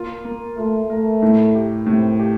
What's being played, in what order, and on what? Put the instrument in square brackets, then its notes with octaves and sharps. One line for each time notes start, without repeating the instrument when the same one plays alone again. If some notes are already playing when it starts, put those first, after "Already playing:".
Already playing: [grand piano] A#3 F4
A#3
[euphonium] A3 [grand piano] F4
[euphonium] A3 [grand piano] A#4
[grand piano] A2
G4
[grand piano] A2 [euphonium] C3
[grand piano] G4